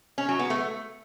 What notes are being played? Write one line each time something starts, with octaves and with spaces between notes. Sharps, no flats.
C#4
F#3
B3
A3